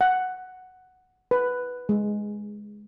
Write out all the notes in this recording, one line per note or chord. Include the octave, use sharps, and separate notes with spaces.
F#5
B4
G#3